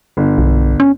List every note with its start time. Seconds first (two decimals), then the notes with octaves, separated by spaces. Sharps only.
0.17 G1
0.38 B1
0.80 C#4